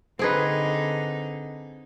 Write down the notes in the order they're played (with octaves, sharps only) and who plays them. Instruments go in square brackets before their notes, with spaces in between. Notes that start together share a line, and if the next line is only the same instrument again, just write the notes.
[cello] D3 D#4 [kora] C4 G#4 B4